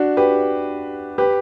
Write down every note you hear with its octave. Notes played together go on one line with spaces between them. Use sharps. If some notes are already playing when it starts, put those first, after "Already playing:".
Already playing: D4 F#4
G4 B4
G4 B4